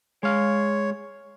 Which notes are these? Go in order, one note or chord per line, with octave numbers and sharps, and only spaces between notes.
G#3 C#5 F5